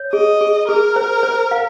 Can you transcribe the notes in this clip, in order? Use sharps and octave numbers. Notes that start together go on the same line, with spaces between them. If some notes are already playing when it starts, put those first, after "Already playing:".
Already playing: C#5
G#4 D#5
G#4
G#4 A#4
C5
C5
F5